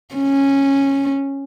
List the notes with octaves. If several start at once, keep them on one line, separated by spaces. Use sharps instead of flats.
C#4